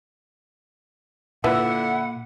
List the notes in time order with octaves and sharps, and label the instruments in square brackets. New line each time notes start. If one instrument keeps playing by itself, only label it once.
[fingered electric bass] A#2 [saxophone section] D3 E4 [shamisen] F4 B4 E5 [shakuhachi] F#5